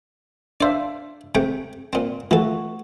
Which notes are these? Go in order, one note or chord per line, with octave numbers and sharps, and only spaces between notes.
D4 C5 D5 E5 F5
C3 A3 G5
A#2 C4
E3 A3 F4 F#4 A4